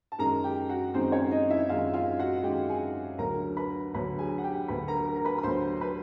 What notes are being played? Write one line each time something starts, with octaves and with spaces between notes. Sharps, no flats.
A5
F#2 D#3 G#3 A#4 A#5
G4 G5
F#4 F#5
F#2 D#3 G#3 C4 C5
C#4 C#5
D#4 D#5
E4 E5
F#2 D#3 G#3 F4 F5
F4 F5
F#4 F#5
F#2 D#3 G#3 G4 G5
G#4 G#5
D2 D3 F#3 A#4 A#5
B4 B5
D2 D3 F#3 B4 B5
G#4 G#5
F#5
G4 G5
D2 D3 F#3 B4 B5
A#4 A#5
A#4 A#5
A#5
B4 B5
B5
D2 D3 F#3 C5 C6
B4 B5